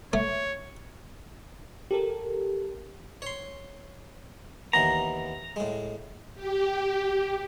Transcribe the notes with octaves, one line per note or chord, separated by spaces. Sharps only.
A3 C#5
G4 A4 A#4
C#5 C6
D#2 E3 B3 A#5
A2 G#3
G4